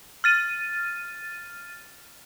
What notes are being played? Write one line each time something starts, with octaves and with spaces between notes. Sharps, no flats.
F6 A6 D#7